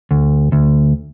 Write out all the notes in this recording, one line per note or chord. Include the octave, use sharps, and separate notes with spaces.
D2
D2